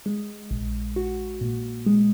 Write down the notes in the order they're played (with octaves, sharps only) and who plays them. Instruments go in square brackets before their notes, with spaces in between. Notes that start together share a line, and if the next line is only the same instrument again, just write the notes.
[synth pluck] G#3
A#1
F#4
A#2
G#3